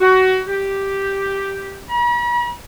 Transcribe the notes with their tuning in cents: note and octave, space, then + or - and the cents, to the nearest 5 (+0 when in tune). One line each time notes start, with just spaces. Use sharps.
F#4 +20
G4 +0
B5 -45